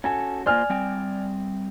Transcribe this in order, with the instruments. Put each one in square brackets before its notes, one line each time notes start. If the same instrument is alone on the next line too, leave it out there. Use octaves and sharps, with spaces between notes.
[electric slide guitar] C#4 F#4 A4 [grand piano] G#5
[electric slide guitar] A#3 F4 C5 [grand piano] D5 G#5 F6
[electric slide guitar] G3 C4 G5